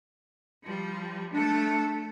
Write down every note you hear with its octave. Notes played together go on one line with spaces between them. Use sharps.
F3 G3
A3 D4 A4